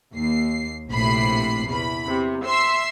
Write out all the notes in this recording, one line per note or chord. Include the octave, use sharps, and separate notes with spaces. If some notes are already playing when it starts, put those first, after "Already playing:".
D#2 C7
A#1 A2 C3 B5 C7
E2 B5
C3
E5 C6 E6 C7